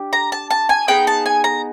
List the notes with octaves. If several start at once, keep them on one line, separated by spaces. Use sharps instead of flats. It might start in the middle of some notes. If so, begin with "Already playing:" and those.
Already playing: D4 G4
A#5
A5
A5
G#5
B3 D#4 G#4 G5
A5
G#5
A#5